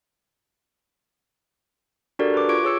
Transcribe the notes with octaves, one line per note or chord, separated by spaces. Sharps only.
D4 F#4 G4 A4 A#4 D5
B4 D6
F4 C#6 D6 G#6 D7
G#4 C#5 E6 C#7